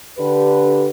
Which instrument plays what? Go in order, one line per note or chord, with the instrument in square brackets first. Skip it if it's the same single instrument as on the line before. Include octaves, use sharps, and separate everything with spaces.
[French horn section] D3 G4 B4